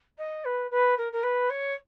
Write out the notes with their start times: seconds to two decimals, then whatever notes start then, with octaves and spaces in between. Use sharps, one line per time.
0.18 D#5
0.45 B4
0.71 B4
0.97 A#4
1.12 A#4
1.23 B4
1.49 C#5